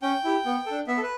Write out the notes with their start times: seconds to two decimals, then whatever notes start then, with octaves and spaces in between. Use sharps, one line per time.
0.02 C#4 G5
0.24 E4 G4
0.45 B3
0.66 D4 A4
0.87 B3 E5
0.97 A4
1.03 B4